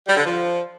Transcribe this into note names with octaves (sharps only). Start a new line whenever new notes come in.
G3
D3
F3